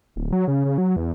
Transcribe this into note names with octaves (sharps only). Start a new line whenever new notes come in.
D1
F#3
C#3
C#3
F#3
E2